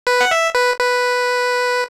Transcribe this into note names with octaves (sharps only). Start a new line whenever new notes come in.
B4
F#5
E5
B4
B4